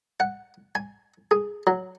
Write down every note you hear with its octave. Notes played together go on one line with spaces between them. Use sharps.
F#5
G#5
G#4
F#3